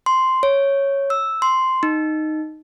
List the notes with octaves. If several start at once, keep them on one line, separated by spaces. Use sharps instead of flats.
C6
C#5
E6
C6
D#4